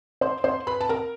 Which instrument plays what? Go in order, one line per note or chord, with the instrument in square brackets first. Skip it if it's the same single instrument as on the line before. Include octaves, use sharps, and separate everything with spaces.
[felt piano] C5 C6
C5 C6
B4 B5
A5
A#4 A#5